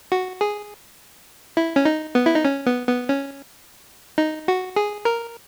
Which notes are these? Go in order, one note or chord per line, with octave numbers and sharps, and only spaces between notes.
F#4
G#4
E4
C#4
D#4
B3
E4
D#4
C#4
B3
B3
C#4
D#4
F#4
G#4
A#4